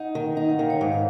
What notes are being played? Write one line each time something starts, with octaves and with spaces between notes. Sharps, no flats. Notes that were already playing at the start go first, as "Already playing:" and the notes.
Already playing: D#4 F#5
D#3
D#4
F#5
D#3 F5
C#5
G#2 F5
F5